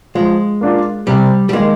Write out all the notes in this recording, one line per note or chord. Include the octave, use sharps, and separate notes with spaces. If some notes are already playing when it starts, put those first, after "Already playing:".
F3 G#3
A#3 D4 F4
C3 G3
G3
D#3 G#3 A#3 D#4